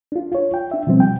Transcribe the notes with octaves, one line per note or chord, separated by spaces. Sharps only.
D4 F4
F4 C#5
G5
D4 E5
B2 D#3 F3 G3 C4
G5